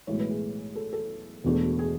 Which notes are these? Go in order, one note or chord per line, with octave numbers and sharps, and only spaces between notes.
B1 A2 E3 G#3 C#5
B4
G#4
A4
A4
E1 E2 B2 A3 D4
G#4